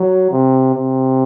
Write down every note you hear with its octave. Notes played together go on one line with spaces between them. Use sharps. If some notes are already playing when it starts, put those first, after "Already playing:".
Already playing: F#3
C3
C3